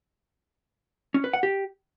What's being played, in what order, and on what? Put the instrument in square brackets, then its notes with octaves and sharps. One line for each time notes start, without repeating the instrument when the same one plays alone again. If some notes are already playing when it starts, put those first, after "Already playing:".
[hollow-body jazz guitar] C#4
B4
F#5
G4